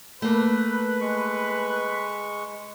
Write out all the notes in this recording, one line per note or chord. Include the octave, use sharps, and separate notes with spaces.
A3 A#3 B4
G#3 C#6